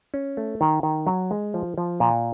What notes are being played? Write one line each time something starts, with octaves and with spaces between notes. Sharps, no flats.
C#4
A3
D#3
D#3
F#3
G#3
F3
F3
A#2